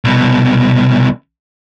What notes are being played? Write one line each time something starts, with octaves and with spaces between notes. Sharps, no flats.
C2 B2